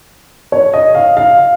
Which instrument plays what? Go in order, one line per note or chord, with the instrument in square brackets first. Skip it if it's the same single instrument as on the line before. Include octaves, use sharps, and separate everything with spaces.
[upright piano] C#5
D#5
F5
F5